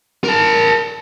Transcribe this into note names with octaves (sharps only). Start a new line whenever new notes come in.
A#4 A5